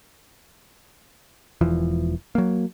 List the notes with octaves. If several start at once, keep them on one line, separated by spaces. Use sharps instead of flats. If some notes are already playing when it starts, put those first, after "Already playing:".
E1 E2 E3 F3
F#3 A#3